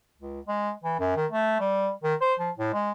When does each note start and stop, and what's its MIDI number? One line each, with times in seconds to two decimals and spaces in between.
0.18 0.40 37
0.48 0.71 56
0.84 0.99 52
1.00 1.14 42
1.16 1.26 51
1.32 1.60 57
1.60 1.90 55
2.03 2.15 51
2.21 2.34 72
2.40 2.51 53
2.57 2.72 45
2.74 2.92 56